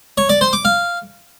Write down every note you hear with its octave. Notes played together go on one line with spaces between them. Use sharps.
C#5
D5
C5
D6
F5